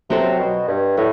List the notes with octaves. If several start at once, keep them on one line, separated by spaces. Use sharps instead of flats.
C3 F#3 C4 F#4 A4 C5
B2
G2
A2 F#3